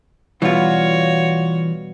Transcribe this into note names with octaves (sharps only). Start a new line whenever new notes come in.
B2 E3 G3 F4 F#4 C#5